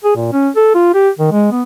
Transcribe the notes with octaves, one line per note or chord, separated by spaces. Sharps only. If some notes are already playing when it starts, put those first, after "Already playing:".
G#4
A#2
C#4
A4
F4
G4
D#3
G#3
B3